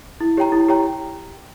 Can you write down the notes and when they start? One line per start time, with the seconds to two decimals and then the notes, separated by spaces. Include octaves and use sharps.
0.21 E4
0.37 G4 C#5 G5 A#5
0.52 E4
0.68 G4 C#5 G5 A#5